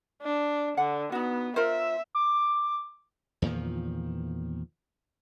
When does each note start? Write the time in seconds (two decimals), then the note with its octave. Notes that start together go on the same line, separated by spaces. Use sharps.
0.22 D4
0.77 D3 F#5
1.12 B3 D#4 F#4
1.56 F4 A#4 C5 E5
2.15 D6
3.42 E2 A#2 D#3 F3